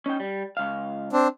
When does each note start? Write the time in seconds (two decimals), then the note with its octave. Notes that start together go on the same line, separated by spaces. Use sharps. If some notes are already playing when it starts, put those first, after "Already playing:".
0.06 C#4 D#4 G5
0.20 G3
0.57 C#2 F5
1.13 C4 D4